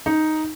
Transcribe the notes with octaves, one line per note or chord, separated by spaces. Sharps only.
D#4